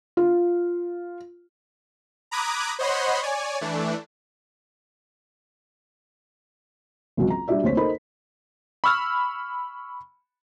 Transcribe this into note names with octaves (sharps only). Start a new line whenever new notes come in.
F4
A#5 B5 D6 D#6 F#6 G#6
C5 C#5 D#5 F#5 B5 C6
C#5 D5 G#5
E3 A3 D4
G#1 C#2 F#3 F#4
A#5
G3 D4 F#4 D5 E5
F#1 D2 C3 C5 C#5 B6
D#4 A4 A#4 C5 D#5 B5
B5 C#6 E6 F6